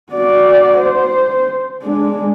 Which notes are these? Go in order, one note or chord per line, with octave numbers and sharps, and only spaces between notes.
F#4 D5
C5
G#3 D4